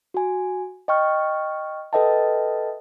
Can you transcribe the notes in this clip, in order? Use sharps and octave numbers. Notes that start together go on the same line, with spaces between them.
F#4 G#5
D#5 G5 C#6 F6
A4 B4 D#5 E5 G5 A5